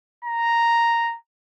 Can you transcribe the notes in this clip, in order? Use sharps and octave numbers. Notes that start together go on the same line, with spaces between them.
A#5